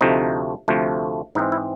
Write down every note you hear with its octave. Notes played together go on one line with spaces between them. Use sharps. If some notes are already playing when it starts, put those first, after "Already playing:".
D2 C3 F3 A3 D#4
D2 C3 F3 A3
G#2 E3 G#3 C4 D#4
E4